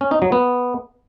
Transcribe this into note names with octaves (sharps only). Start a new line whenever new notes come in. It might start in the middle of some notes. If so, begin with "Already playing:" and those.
C#4
D#4
F#3
B3